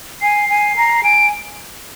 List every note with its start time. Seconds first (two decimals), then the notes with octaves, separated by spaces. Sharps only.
0.21 G#5 C7
0.49 G#5
0.76 A#5
1.03 G#5 D7